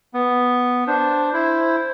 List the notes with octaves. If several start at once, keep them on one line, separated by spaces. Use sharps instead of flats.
B3
D4 C5
E4 C5